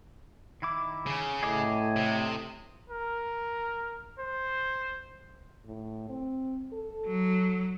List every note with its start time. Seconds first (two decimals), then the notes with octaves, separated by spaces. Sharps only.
0.62 D#3 E4 D6
1.06 C#3
1.43 A2 G#4 D#5 D6
1.96 C3
2.90 A#4
4.19 C5
5.66 A2
6.09 C4
6.73 A4
7.06 F#3